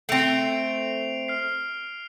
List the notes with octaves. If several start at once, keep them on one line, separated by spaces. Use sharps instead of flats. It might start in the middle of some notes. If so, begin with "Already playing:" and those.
A3 C4 C7 D7 F7
F6 C7